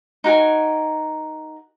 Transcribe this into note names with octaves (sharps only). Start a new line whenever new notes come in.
D#4 F#4 A#4 G#5